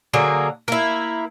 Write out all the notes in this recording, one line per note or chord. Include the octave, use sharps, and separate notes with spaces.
D3 F#3 A#3 G#4
A#3 E4